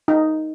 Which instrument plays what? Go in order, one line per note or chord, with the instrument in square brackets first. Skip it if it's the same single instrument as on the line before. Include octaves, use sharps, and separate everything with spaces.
[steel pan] D#4